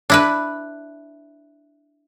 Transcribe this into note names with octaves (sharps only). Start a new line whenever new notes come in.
D4 E4 B4